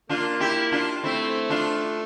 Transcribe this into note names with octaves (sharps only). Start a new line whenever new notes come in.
A#3 D4 F4
E4 G4
D4 F4
A3 C4 E4
D4 F4